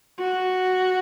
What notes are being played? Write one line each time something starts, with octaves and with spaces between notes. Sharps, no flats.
F#4